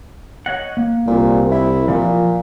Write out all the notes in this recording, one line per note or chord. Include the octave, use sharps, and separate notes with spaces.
C#5 D#5 F#5
A#3
C2 A#2
E4
A#2 F3